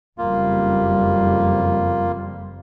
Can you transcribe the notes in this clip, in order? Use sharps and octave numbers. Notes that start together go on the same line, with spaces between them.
F#1 F2 G3 A#3 F4